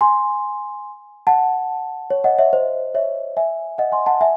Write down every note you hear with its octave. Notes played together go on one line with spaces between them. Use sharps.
G#5 C6
F#5 A5
C#5
D#5 F#5
C#5 E5
C5 D#5
C#5 E5
E5 G#5
D#5 F#5
G#5 C6
F#5 A5
E5 G#5